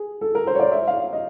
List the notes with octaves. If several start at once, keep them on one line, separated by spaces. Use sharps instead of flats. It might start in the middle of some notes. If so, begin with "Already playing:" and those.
Already playing: G#4
A4
A#4
C5
C#5
D5
E5
F5
D#5